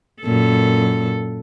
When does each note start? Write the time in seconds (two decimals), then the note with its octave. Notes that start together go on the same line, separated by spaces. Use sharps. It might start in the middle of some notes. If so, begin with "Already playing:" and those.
0.22 F#2 A#2 A4